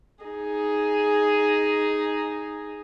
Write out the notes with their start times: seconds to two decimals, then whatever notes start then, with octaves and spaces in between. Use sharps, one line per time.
0.24 D#4 G#4